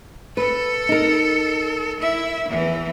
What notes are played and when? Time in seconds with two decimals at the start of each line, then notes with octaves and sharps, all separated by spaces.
0.37 A4 B4
0.89 D#4 A#4
2.00 E4 E5
2.49 E2 E3